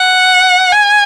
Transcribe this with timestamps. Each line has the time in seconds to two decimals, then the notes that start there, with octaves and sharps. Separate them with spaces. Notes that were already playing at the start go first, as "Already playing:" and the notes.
Already playing: F#5
0.73 G#5